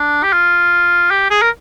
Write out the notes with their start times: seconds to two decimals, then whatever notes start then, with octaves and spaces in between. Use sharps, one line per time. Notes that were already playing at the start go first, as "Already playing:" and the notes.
Already playing: D4
0.23 G4
0.33 F4
1.11 G4
1.31 G#4
1.42 A#4